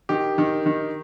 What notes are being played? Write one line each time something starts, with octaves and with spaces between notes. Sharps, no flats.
D#3 G4
D#3
D#3